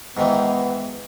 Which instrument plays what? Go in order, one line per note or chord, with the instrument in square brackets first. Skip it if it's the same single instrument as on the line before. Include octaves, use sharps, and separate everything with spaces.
[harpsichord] G#2 D#3 E3 [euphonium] B3